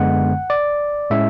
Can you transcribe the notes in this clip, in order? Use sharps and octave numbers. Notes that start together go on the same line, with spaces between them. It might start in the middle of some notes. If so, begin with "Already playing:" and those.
Already playing: F#2 D3 G#3 B3 F#5
D5
A2 G#3 C#4 E4 E5